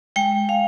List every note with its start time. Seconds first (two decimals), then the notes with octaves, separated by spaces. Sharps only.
0.16 G#3 G5
0.49 G#3 F5